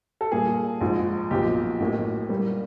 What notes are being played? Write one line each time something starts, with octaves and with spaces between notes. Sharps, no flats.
A4
A#2 G3 A#3 G#4
A#1 G#2 F3
B1 A#2 F3 G4
A1 A2 F#3 A#3
A#2 G3 A#3